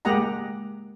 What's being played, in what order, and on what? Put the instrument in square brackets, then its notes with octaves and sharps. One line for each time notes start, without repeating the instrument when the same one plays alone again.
[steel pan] G#3 A#3 G4 D#5 F#5 A#5